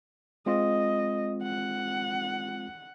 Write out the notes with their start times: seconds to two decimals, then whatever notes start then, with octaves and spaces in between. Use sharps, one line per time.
0.46 G#3 C4 F4 D#5
1.42 F#5